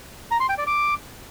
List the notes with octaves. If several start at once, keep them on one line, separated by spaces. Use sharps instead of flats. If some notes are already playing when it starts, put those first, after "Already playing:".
A#5
C6
G5
D5
D6